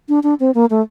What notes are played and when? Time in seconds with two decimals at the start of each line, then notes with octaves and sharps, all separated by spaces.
0.09 D4
0.23 D4
0.40 C4
0.55 A#3
0.70 A3